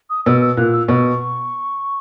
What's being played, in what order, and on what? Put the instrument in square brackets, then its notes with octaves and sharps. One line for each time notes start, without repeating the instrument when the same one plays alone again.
[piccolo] D#6
[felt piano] B2 [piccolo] E6
[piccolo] E6
[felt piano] A#2 [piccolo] F#6
[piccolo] E6
[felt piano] B2 [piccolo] C#6